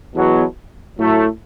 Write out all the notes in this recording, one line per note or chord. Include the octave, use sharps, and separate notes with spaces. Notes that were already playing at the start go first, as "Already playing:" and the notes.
E2 B2 F#3
A2 F#3 A3